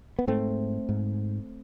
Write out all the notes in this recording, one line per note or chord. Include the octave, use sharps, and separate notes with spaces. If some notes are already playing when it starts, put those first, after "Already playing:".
B3
G#2 A3 C4
G#2